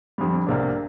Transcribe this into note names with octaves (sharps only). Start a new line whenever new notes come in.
F2 D3 G3
C2 C3 A#3 D4